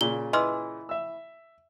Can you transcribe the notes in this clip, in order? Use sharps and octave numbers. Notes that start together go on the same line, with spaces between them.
A#2 C#3 G7
E3 D#5 C6 F6
E5 E6